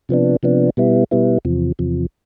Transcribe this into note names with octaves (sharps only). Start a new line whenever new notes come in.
C3 F3 B3 D4
C3 F3 B3 D4
B2 G3 B3 E4
B2 G3 B3 E4
E2 C3 F3
E2 C3 F3